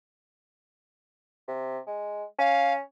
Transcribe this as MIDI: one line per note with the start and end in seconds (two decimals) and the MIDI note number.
1.48 1.79 48
1.87 2.24 56
2.39 2.80 61
2.39 2.73 77